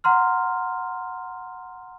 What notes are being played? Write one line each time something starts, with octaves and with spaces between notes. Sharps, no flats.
F#5 A#5 C6 F6